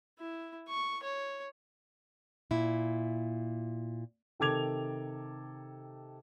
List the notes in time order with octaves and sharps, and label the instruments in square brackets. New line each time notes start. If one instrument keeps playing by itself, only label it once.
[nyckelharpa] E4
C#6
C#5
[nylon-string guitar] A#2 E4
[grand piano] C3 D#3 A4 D6 G#6 F7